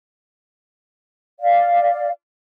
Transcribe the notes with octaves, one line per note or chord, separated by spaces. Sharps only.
D5 F5